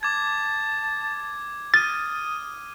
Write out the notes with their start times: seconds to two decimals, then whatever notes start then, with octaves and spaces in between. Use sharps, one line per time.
0.03 A5 D6 G#6
1.74 D#6 F6 A6 D#7